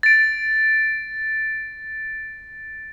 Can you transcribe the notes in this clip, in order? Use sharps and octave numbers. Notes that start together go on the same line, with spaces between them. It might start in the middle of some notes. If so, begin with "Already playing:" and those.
A6 D7